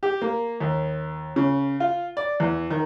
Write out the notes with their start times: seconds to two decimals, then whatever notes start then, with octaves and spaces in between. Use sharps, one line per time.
0.03 G4
0.21 A#3
0.60 D#2
1.36 C#3
1.80 F4
2.17 D5
2.40 E2
2.71 D#3